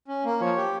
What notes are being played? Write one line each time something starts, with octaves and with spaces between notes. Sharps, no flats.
C#4
A#3
F3 C#5
G4